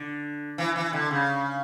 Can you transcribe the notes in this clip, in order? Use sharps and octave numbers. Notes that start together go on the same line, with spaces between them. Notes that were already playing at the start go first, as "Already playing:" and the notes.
Already playing: D3
E3
E3
D3
C#3